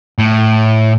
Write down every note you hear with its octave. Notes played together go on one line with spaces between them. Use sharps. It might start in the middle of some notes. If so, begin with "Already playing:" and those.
A2